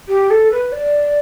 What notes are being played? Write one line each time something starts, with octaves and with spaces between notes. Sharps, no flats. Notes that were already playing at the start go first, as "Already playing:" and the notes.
G4
A4
B4
D5